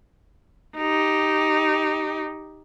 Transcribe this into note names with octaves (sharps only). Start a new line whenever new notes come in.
D#4 G4